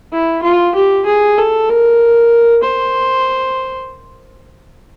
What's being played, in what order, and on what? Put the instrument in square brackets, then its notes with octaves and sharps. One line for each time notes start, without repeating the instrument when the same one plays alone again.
[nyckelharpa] E4
F4
G4
G#4
A4
A#4
C5